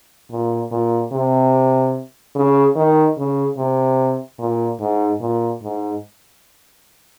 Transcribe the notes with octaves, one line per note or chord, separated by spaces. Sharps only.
A#2
A#2
C3
C#3
D#3
C#3
C3
A#2
G#2
A#2
G#2